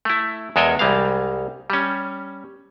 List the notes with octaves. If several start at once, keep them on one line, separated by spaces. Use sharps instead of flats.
A3 E4
E2 G#3 A4 A#4 D#5 G#5
C2 G3 G#3 F5
G3 C#4